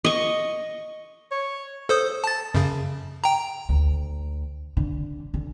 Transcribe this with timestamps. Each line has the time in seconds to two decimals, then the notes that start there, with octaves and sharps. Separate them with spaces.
0.05 D#5 C#6
1.31 C#5
1.89 A4 C5 D#6
2.24 A5 A6
2.54 F#2 C#3
3.24 G5 A#5
3.69 D2
4.77 D3
5.34 D3